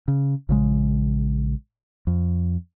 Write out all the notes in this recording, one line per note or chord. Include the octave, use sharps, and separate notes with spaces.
C#3
A#1 C#3 G#3
F2